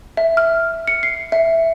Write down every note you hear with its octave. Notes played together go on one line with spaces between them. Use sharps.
E5
F6
C#7
C7
E5